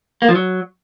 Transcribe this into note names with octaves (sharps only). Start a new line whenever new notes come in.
A#3
F3
F#3